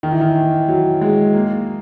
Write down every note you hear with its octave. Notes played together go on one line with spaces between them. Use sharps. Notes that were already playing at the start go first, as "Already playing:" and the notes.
D#3
E3
D#3
F#3
G#3
A#3